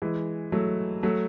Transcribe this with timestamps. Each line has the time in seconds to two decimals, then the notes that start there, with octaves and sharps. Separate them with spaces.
0.02 E3 G#3
0.52 F#3 A3
1.03 F#3 A3